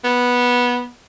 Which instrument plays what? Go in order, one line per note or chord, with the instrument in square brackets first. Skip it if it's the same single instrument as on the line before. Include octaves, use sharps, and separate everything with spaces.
[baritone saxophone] B3